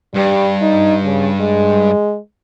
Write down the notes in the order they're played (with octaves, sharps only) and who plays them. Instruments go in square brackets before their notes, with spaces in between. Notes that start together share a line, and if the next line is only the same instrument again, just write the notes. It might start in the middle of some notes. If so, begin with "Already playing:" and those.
[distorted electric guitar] G2 [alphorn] G3
[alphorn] D#4
C#3
G#3